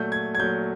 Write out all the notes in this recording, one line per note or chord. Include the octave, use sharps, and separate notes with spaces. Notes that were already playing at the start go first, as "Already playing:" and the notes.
Already playing: A#2 F#3 A3 G6
G#6
G#6
A#2 F#3 A3 G6